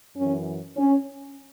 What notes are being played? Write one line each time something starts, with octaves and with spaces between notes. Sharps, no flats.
F#2 E3 C#4
C#4